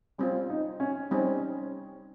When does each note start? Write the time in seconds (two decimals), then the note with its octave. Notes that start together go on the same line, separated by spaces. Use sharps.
0.18 G3 C4 C#4 F4
0.50 D#4
0.80 C#4
1.11 G3 C4 C#4 D#4